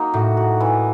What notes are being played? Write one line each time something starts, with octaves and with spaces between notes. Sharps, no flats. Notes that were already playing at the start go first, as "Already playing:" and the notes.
Already playing: F#3 A#3 D#4
A2 F#4
F#4
E3